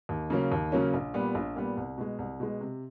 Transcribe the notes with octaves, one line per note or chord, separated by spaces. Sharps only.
D#2
C#3 F#3 A#3 C#4
D#2
C#3 F#3 A#3 C#4
A#1
A#2 G3 B3
A#1
A#2 G3 B3
C2
B2 G#3
C2
B2 G#3
C3